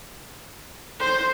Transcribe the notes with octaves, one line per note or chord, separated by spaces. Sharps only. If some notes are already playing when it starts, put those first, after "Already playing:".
C5